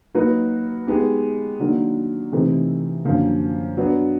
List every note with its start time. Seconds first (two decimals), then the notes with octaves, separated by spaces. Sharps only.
0.14 F#3 A#3 D#4 F#4 B4
0.87 G#3 B3 D#4 G4
1.60 D#3 F#3 A#3 D4
2.32 C3 E3 A3 C4 D#4
3.05 F#2 D3 F3 A#3
3.77 F#3 B3 D4